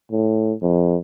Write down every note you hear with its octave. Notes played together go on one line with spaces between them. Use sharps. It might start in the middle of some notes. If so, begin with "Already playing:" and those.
A2
F2